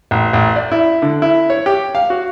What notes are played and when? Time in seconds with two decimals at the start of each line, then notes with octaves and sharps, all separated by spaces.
0.11 A1
0.33 A1
0.56 D5
0.72 E4
1.02 D3
1.22 E4
1.50 C#5
1.66 G4
1.95 F5
2.10 F#4